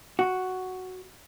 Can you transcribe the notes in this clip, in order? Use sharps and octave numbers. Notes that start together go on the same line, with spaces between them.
F#4